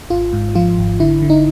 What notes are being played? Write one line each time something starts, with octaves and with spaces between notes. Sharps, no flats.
G#1 F4
G#2
F3 F4
G#1
D3 E4
D3
D#4